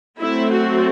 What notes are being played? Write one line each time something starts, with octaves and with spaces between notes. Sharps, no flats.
F#3 A3 C4 E4
F#4